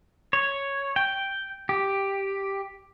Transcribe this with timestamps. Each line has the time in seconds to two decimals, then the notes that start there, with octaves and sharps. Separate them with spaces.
0.33 C#5
0.96 G5
1.69 G4